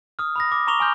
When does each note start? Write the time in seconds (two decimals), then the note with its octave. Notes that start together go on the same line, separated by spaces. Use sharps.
0.19 D#6 F6
0.36 B5 D#6 A#6
0.52 D6
0.67 A#5 C#6 D6 F7 G7
0.80 G#5 C6 D6 F6 G6